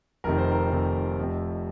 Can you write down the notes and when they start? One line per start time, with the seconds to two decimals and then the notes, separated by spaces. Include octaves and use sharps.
0.24 F1 F2 C3 D#3 A#4
0.38 C5
0.51 A#4
0.70 F1 F2 C3 D#3
1.18 F1 F2 C3